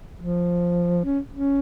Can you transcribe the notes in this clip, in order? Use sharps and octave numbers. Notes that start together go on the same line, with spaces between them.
F3
C#4
C#4